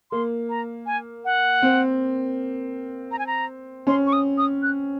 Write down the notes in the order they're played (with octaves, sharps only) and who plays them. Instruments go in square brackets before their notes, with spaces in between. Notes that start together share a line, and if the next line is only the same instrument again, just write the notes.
[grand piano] A#3 [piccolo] C6
[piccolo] A#5
G#5
F#5
[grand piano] C4
[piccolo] A#5
G#5
A#5
[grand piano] C#4 [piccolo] C6
[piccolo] C#6
D#6
D#6
F#6